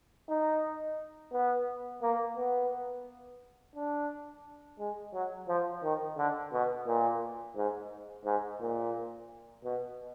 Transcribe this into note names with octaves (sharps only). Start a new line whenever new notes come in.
D#4
B3
A#3
B3
D4
G#3
F#3
F3
D#3
D3
B2
A#2
G#2
G#2
A#2
B2